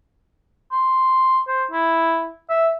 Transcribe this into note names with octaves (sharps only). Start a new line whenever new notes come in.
C6
C5
E4
E5